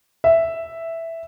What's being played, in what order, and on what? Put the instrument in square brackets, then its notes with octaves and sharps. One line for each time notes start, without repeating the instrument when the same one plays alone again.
[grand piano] E5